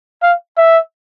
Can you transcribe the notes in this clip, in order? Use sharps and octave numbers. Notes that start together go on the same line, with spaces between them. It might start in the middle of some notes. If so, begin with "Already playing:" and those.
F5
E5